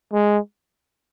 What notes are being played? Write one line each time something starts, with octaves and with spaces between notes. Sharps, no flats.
G#3